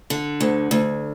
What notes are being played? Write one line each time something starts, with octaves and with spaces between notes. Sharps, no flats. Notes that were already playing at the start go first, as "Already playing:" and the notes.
D3
D2
D2